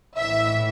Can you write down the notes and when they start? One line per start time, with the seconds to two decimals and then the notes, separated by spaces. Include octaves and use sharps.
0.17 A#1 A2 E3 E5